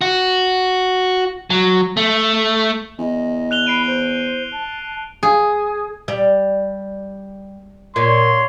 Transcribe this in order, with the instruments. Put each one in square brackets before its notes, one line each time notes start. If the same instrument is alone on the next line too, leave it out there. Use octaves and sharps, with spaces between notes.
[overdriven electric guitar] F#4
F#3
A3
[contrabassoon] E2 [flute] D#5
[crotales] F#6 F7 G7
[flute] B5 [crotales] C7 D7 D#7
[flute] C5
A5
[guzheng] G#4
[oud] G3
[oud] A#2 [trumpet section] C#5 C6